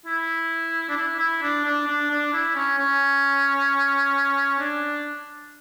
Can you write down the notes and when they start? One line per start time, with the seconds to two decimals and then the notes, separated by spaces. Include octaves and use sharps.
0.06 E4
0.89 D4
0.97 E4
1.19 E4
1.42 D4
1.65 D4
1.87 D4
2.10 D4
2.33 E4
2.55 C#4
2.79 C#4
4.60 D4